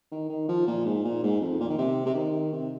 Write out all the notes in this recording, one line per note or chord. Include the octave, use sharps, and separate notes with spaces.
D#3
D#3
F3
A#2
G#2
A#2
G#2
F2
A#2
D#3
C3
C3
D#3
C3